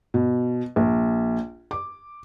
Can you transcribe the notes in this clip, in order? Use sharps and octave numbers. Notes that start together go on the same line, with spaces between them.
B2
A#1
D6